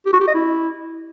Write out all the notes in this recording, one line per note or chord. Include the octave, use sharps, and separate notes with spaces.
G4
F#4
G4
D#5
E4